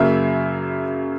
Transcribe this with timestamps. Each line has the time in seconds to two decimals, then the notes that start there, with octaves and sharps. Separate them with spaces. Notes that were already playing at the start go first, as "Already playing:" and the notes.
Already playing: F#2 C#3 F#3 A#3 E5